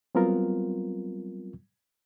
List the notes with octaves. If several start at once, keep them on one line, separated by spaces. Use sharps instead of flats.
F#3 G3 B3 C4 F4 A#4